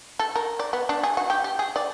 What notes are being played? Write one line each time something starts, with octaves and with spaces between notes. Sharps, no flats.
A4
A#4
D5
B3
D4
G#4
F#4
G4
G4
G#4
D5